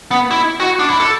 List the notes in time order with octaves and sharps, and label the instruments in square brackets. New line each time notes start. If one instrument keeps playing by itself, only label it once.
[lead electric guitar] B3
E4
F#4
D4
E4
A4